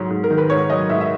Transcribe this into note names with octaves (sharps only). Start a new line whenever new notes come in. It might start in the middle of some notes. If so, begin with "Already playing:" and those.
Already playing: G#2 F#3
G#2
A#4
D#3
B4
G#2 C#5
F#3 D#5
G#2 E5
E5